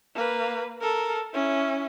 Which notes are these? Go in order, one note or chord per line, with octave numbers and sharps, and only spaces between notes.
A#3 B4
A4 A#4
C#4 E4